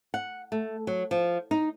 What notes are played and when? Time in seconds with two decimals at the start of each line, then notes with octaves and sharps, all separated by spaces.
0.14 F#5
0.52 A3
0.87 F#3
1.11 F3
1.51 D#4